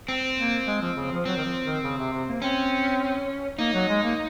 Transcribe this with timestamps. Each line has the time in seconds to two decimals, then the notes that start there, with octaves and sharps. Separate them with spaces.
0.09 C4
0.38 A#3
0.67 G#3
0.81 F3
0.96 C#3
1.11 F3
1.26 F#3 C4
1.37 D#3
1.45 F3
1.65 D#3
1.84 C#3
1.98 C3
2.12 C3
2.28 A#3
2.41 C4 C#4
3.59 A#3 D#4
3.73 F#3
3.88 G#3
4.03 A#3